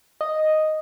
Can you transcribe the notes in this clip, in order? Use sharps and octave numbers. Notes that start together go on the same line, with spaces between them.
D#5